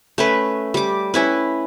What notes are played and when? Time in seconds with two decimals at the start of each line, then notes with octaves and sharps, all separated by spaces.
0.18 A3 C#4 B4
0.74 G3 D6
1.14 C#4 E4 B4